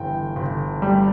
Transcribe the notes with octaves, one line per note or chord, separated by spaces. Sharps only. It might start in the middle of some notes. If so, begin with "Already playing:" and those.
Already playing: G1 E3 G5
G1
G3